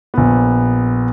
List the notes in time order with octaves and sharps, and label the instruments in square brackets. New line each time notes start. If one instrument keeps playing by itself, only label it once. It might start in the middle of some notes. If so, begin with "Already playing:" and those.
[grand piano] A#1 B3